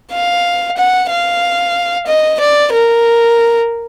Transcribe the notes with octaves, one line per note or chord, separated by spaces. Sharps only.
F5
F#5
F5
D#5
D5
A#4